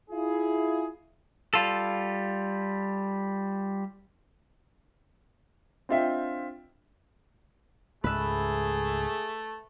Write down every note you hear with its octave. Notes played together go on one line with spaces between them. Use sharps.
E4 F4 G#4
G3 F4 A4
C4 D4 F4 D#5 E5 G5
C#2 G#2 A3 G#4 B4 E5